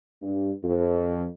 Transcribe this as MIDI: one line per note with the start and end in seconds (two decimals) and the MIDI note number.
0.22 0.51 43
0.64 1.25 41